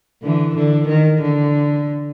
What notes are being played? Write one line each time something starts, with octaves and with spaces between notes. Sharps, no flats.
D3 E3
D3
D#3
D3